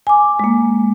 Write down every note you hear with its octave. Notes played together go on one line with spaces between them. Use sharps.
G#5 D6
G#3 A#3